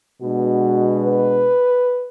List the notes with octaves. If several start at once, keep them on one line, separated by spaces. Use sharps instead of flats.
B2 G#3 B3 D4 F#4
B4